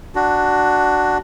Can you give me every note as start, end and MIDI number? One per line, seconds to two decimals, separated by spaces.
0.15 1.18 62
0.15 1.18 66